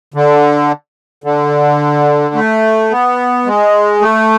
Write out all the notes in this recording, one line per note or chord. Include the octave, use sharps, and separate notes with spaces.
D3
D3
A3
B3
G#3
A3